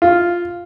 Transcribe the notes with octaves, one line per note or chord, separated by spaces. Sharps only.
F4